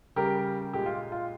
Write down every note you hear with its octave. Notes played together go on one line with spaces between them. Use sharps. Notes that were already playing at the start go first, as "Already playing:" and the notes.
C#3 G3 G4 A#4
A#2 G#3 G4
F4
F4